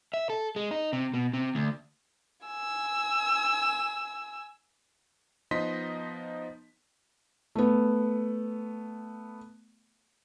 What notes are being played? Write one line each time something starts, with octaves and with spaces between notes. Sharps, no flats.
E5
A4
G#3
D#4
C3
B2
C3
D2
G#5 E6
F3 B3 D#4 D#5 C6 B6
A3 B3